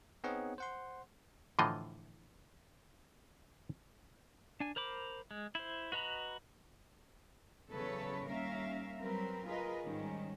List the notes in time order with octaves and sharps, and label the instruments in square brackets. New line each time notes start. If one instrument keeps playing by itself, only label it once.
[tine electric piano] B3 C4 D#4 G#4 C#5 F#5
C5 F#5 C6
[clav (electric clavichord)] A2 D3 E3 F3 F4 D#5
[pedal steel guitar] D4 G#5
A#4 C5 B5 D6
G#3
E4 C5
F#4 B4 D#5 A#5 B5
[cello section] E2 C#3 F#3 A4 B4 C#5
D#2 G3 C#4 A#4 E5 F5
F#3 G3 C4 A#4 B4
F4 G#4 A#4 B4 D#5
G#2 D#3 G3 C#4